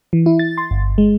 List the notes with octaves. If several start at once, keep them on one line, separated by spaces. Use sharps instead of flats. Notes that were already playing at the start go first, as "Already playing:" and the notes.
E3
E4
A6
C6
G1
G#3